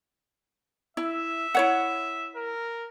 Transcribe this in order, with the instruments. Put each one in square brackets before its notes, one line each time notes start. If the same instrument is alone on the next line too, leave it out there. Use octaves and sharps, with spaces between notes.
[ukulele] E4 [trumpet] E5
[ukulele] E4 C#5 F#5
[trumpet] A#4